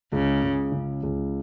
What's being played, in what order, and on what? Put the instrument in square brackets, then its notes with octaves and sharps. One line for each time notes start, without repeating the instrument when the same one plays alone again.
[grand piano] C#2 [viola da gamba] C#3
[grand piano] C#2
C#3
C#2